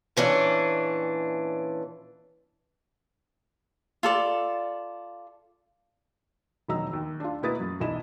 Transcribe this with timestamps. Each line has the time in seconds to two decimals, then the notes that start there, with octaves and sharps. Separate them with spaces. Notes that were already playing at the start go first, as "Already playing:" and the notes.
0.17 A#2 E3 C#4 D4
4.03 F4 A4 D5
6.68 E1 D#3 F#3 D#5 A#5 E6
6.93 D#2
7.20 D4 F4
7.42 B2 A#3 E4 B4 D#6 A6
7.60 F#2
7.80 E1 B1 E4 D#5 E7